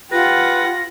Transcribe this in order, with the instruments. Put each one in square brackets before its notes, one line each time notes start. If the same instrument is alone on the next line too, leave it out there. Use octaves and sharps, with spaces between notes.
[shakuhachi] F4 [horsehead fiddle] G4 F#5 [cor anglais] B4 [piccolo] A#6